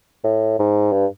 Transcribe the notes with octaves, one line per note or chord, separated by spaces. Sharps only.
A2
G#2
G2